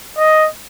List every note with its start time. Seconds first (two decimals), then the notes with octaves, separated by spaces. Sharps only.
0.18 D#5